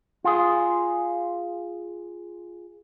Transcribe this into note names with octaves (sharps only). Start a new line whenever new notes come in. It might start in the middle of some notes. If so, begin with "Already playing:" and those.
F4 G#4